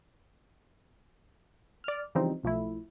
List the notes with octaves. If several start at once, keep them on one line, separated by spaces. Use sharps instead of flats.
D5 F6
C#3 E3 F3 G3 C4 D#4
B1 F3 A3 E4